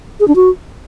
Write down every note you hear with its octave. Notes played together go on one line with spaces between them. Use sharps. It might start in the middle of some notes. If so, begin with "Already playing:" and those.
G#4
D4
F#4